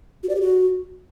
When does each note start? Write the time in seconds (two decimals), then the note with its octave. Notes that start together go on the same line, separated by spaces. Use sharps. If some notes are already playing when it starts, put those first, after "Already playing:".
0.23 F#4
0.29 D5
0.35 G4
0.41 F#4